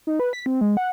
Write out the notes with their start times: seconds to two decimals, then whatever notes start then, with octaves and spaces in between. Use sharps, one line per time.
0.07 D#4
0.20 B4
0.33 B6
0.46 C4
0.61 G#3
0.77 F#5